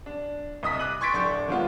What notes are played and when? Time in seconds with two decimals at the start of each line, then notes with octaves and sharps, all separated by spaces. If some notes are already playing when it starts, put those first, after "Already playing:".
0.06 D4
0.63 C2 D#5 D#6 B6
0.79 D6 F#6 D#7 F#7
1.01 C6 C#6 G#6 A6 B6 D7
1.13 D1 D4 C6 C#6 G6
1.48 D#3 F3 G#3 B3 C#4 F4